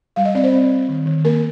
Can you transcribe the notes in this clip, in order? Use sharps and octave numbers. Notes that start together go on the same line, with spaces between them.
G3 F5
D#5
C4 D5
C5
C4
C4
D#3
D#3
A#3 A#4